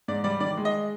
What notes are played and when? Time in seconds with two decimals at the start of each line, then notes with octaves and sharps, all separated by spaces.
0.08 G#2 D5
0.24 G3 D5
0.40 D#3 D5
0.57 G#3
0.65 D#5